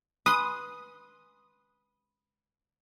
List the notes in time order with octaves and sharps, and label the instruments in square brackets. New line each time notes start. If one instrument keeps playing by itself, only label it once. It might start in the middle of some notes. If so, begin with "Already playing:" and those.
[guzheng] B4 C6 [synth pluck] D#6